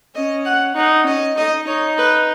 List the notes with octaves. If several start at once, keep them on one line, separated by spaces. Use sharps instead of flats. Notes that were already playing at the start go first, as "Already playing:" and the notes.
C#4 D#5
F#5
D#4 F#5
C#4 D#5
D#4 D#5
D#4 C#5
B4